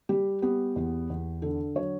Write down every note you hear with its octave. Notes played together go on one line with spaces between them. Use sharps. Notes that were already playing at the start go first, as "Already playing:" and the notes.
G3 G4
B3 G4
E2
E2
D3 A4
F#3 C#5